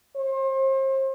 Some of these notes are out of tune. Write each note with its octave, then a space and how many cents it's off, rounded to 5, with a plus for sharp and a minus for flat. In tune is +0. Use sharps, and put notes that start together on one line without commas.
C5 +35